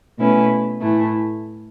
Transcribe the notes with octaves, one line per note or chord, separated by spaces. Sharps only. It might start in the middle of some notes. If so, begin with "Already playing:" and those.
B2 A3 C#4 E4 B4
A2 E3 A3 E4